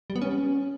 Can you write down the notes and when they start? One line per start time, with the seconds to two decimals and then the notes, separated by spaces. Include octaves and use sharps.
0.10 G3
0.16 B3
0.22 C#4